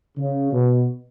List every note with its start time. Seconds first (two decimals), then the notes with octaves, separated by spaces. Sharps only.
0.18 C#3
0.52 B2